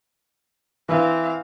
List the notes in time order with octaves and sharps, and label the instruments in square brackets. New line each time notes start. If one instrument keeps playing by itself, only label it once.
[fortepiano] E3 [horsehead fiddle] C4 F5